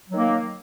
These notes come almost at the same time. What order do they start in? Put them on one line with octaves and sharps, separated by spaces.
F#3 D#3 A#3